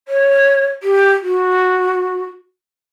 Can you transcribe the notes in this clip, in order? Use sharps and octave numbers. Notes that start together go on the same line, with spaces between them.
C#5
G4
F#4